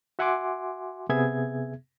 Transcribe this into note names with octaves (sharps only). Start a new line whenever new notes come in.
F#4 E5 F#5 G#5 C6 D6
C3 B3 G#4 E5 G#6